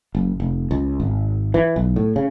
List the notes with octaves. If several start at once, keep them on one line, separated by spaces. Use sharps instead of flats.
F#1
F1
C#2
G#1
E3
B1
A2
C#3